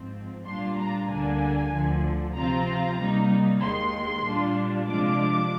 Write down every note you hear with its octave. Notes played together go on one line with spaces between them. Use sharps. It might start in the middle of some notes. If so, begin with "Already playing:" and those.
Already playing: G#2 F3 C4
A#2 G3 D4 F4 C6
A#5
D2 D3 G3 A#3 D4 G#5
D2 D3 F3
C3 F3 C4 F4 A#5
C3 G3 A#3 D#4
D#2 D#3 G#3 C6
A#2 G3 D4 F4
C3 F3 G#3 D4 F4 D6